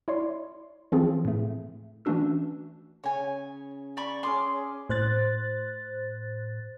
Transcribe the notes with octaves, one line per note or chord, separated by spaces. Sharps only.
E4 C#5 D5 C6
E3 F3 C4 F4 G#4
A2 A3
E3 A3 C#4 D4 F#4 E6
C#3 C#5 G#5
D5 B5 C#6
C#4 G#4 C6 D6
A2 C5 F#6 A6